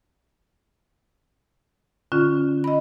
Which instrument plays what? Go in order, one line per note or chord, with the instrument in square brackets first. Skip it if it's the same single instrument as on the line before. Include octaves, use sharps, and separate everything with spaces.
[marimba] D3 C#4 F4
D#5 B5